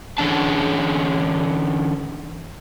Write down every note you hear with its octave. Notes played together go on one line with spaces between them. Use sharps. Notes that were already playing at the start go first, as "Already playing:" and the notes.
D3 E3 C#4 D4 A5